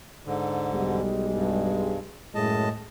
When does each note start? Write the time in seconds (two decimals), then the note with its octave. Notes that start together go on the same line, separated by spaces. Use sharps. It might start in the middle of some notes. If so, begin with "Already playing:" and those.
0.25 G#2 D3
0.71 B1 G3 G#3
1.33 G2
2.35 F#2 A2 G#3 D#5 A5